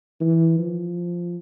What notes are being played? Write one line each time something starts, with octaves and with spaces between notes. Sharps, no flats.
E3
F3